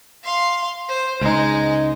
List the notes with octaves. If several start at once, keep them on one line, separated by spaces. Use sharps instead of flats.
F5 C6
C5
C#2 G#3 D#4 D#5